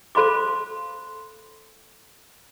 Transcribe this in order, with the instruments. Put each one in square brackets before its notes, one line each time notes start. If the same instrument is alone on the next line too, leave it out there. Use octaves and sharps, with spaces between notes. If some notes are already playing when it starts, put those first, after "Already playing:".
[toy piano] A4 C5 F5 B5 C6 D6